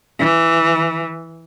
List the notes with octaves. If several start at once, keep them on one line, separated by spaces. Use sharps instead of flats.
E3